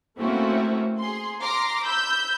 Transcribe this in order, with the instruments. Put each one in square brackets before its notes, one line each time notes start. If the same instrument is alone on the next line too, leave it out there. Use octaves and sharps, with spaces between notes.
[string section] A3 A#3 C4 C#4 E4 F#4
G#4 C6
A#5 C6 D6 F6 A#6
B5 E6 G6